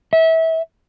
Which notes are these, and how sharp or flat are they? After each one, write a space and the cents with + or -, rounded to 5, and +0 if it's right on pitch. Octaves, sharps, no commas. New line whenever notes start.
E5 -25